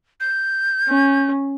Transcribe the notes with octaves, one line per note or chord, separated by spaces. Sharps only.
G6
C#4